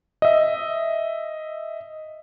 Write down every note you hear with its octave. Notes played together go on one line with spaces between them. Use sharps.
D#5 E5